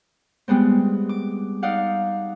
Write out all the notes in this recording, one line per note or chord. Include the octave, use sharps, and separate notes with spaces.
G3 G#3 B3 C4
D6
D#4 D5 F5 F#5